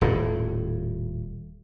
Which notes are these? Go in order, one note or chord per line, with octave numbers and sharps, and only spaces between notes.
D#1 A2